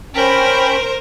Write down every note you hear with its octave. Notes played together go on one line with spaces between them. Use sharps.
C#4 A#4 C5 G5 B5